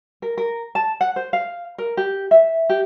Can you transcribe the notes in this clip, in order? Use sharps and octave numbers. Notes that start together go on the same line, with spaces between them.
A#4
A#4
A5
F#5
C5
F5
A#4
G4
E5
G4